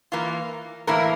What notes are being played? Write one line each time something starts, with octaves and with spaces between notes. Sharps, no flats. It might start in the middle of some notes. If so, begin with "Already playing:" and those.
E3 A#3 F4
A2 E3 A#3 E4 A#4